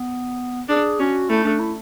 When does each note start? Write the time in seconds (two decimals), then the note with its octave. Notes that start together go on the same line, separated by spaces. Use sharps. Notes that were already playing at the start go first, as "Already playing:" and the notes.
Already playing: B3
0.69 D4 G#4
1.00 C#4 F#4
1.29 A3 E4
1.45 D4
1.59 E4